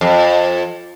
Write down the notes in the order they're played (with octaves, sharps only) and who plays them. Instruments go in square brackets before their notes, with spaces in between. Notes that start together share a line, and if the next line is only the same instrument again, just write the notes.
[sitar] F2